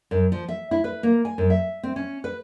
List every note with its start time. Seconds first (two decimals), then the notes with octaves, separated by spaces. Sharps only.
0.11 F#2
0.32 F3
0.48 E5
0.71 E4
0.84 B4
1.03 A#3
1.25 G#5
1.38 F#2
1.50 E5
1.83 C4
1.96 C#4
2.24 B4